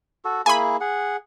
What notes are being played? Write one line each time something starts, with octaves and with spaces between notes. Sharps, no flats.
F#4 A4
A#3 E4 G#4 G#5 B5
G#4 F#5